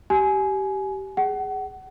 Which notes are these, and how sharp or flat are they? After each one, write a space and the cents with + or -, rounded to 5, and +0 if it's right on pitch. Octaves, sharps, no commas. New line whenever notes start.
G4 -20 G#5 +20
G#4 -5 F#5 +30